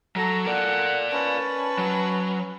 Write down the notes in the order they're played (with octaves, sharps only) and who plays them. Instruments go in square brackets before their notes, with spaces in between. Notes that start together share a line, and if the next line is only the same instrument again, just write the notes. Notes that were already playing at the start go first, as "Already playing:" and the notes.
[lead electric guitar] F#3 [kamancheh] A4 [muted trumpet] A#5
[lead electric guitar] A#4 D5 [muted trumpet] F#5
[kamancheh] C#4 B4 [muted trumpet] A5
[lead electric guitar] F#3